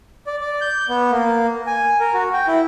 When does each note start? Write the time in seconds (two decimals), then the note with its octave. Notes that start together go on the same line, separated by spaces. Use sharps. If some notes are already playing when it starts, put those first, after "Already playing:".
0.27 D5
0.41 D5
0.61 G6
0.89 B3
1.11 A#3
1.67 G#5
2.00 A#4
2.14 F#4
2.34 G5
2.47 E4